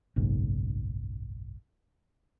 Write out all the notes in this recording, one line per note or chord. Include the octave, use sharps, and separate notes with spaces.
F#1 B1 G#2 C#3